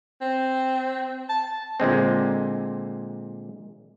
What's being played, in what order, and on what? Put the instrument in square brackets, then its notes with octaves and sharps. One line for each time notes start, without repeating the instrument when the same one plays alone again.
[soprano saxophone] C4
A5
[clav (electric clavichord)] A#2 D3 G#3 C4